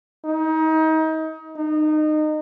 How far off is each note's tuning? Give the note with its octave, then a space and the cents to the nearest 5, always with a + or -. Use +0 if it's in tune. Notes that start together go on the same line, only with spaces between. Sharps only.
D#4 +30
D#4 -25